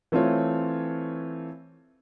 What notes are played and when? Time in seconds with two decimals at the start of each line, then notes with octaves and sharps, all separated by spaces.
0.12 E3 A3 C4 F4 C#5